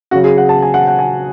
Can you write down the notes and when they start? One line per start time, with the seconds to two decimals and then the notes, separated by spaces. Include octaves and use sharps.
0.11 C#3 F#3 F#4
0.24 G#4
0.37 F#5
0.49 A5
0.62 G#5
0.74 F#5
0.87 F#5
0.99 G#5